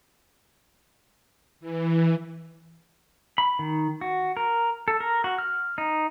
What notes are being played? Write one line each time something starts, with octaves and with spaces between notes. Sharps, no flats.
E3
B5
D#3
F#4
A#4
A4
A#4
F#4
F6
D#4